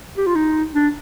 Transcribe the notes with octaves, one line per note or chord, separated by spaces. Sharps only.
G4
F4
D#4
D4